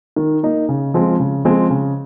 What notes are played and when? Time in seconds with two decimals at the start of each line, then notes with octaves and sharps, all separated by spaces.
0.16 D#3
0.43 A#3 D#4
0.69 C#3
0.94 F3 G#3 C4
1.20 C#3
1.45 F3 G#3 C4
1.70 C#3